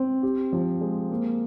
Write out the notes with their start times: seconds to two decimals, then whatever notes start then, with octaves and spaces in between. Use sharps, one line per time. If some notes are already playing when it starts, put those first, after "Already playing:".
Already playing: C4
0.23 G4
0.53 F3
0.81 G#3
1.11 A#3